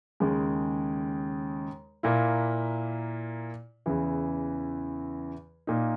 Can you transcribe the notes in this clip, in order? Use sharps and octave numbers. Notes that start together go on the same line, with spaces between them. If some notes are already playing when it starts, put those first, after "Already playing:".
D#2 C#3 G#3
A#2 A#3 E4
E2 C#3 E3
A#2 A#3 D#4